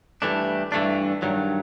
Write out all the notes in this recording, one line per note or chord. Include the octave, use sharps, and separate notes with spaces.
G2 E3 A3 D4
G2 E3 A3 D4
G2 D#3 F#3